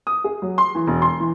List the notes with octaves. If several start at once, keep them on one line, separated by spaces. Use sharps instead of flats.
D#6
G#4
F#3
C6
E3
E1
C6
E3